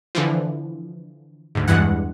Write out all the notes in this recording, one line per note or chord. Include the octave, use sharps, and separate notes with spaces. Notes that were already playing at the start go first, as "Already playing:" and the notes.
D3 E3 F3
D2 G#2
E2 G2 E3 G#3 F#5